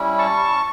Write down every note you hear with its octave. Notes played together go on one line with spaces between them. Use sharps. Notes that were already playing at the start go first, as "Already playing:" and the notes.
Already playing: G3 C#4 E4
A5 C#6